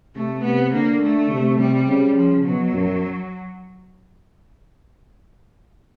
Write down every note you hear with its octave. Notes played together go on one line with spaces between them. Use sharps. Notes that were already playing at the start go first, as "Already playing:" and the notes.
C3 A3
C3 B3
D3 A#3
A3
C3
C3 G3
C#3
F3
B2 F#3
F#2